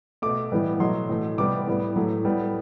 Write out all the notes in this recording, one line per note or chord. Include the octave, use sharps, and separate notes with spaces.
B2 A3 D6
A2 E3 G3 B3
B2 F#3 A3 C6
A2 E3 A3
C3 G3 B3 D6
A2 G3 B3
A2 F#3 A3
A2 G3 B3